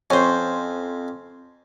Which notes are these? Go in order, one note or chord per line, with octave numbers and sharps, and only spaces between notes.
F2 C#4 C5